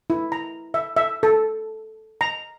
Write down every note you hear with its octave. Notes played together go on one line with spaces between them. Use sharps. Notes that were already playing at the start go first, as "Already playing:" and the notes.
E4
A#5
E5
E5
A4
A#5